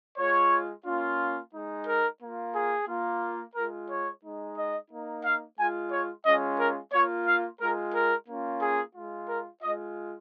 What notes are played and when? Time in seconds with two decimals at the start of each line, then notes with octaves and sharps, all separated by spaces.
0.18 G#3 F4 C#5
0.86 A#3 C#4 F4
1.54 G#3 D#4
1.87 A#4
2.21 A#3 F4
2.55 G#4
2.89 A#3 F4
3.56 G#3 F4 A#4
3.90 C#5
4.23 G#3 D#4
4.57 D#5
4.91 A#3 D#4
5.25 F5
5.58 G#3 F4 G#5
5.92 C#5
6.26 G#3 C#4 F4 D#5
6.59 A#4
6.93 A#3 F4 C#5
7.27 F5
7.61 G#3 F4 A#4
7.94 A#4
8.28 A#3 C#4 F4
8.62 G#4
8.96 G#3 F4
9.29 A#4
9.63 G#3 F4 D#5